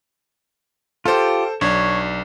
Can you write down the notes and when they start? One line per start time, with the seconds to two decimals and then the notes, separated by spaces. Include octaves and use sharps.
1.05 F4 G4 A4 C5
1.61 B1 D4 C#5